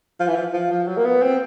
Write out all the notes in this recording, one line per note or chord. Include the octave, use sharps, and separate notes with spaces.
F3
E3
F3
F3
F3
F#3
A#3
B3
C4